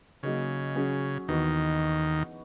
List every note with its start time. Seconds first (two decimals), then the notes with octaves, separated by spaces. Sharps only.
0.23 C#3 F#3 A#3 D#4 G#4
0.76 F#3 C#4 G#4
1.28 D#2 D#3 E3 B3 D#4 F#4